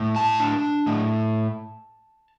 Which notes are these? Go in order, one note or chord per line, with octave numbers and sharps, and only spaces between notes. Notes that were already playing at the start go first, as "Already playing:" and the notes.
Already playing: A2
A5
D4
A2